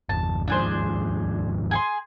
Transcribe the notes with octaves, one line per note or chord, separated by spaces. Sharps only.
G1 E2 A5
D#2 G#2 F3 D4 G#4 C5
G#4 G#5 C6